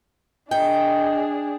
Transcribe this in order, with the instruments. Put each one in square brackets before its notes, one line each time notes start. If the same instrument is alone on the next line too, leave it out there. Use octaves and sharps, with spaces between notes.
[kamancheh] D4 G#4 [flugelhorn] D#5 [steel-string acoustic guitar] G5